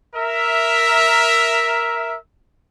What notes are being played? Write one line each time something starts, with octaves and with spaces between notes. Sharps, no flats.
A#4 E5